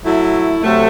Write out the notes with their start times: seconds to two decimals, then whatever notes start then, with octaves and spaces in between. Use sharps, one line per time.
0.03 F#3 A3 E4
0.63 C3 F#3 A3